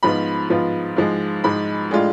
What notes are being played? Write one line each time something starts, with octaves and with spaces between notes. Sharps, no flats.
G#2 F3 B3 F4 B5
G#2 F3 B3 F4
G#2 F3 G#3
G#2 F3 G#3 B5
A2 G#3 D4 F4